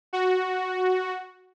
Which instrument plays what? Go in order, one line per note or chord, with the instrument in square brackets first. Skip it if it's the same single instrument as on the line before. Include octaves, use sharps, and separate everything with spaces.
[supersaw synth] F#4